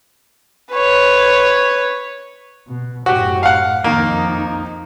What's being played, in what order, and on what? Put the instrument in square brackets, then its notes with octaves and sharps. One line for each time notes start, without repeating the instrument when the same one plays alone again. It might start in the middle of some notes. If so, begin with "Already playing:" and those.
[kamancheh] B4 C#5
[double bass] B2
[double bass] F#2 A2 [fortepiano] F#4 G4
[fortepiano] F5 F#5
[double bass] F2 D#4 [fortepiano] D#3 A#3